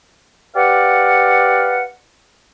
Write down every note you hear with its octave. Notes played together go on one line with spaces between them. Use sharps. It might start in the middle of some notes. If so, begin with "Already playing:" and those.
G4 B4 D5 F5 F#5